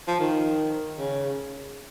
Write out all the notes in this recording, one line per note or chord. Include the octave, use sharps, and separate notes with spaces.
F3
D#3
C#3